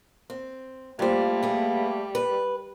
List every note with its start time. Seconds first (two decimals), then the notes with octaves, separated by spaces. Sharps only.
0.30 C4
0.99 G3 A3 A#3 F4 C5
1.43 B3 G#4
2.15 B4